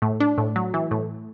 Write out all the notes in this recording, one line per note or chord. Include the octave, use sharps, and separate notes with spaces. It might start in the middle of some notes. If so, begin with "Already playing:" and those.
A2
D4
A2
F#3
E3
A2